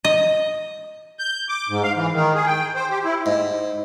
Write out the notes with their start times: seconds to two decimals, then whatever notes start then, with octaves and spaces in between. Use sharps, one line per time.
0.05 D#5
1.19 G6
1.49 D6
1.69 G#2
1.83 F5
1.96 E3
2.13 D#3
2.35 G#4
2.46 G5
2.75 C5
2.90 G4
3.04 E4
3.26 G#2